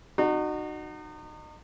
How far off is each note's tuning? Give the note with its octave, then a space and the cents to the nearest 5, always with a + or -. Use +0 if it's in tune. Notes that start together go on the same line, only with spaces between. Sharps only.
D#4 -35 F#4 +0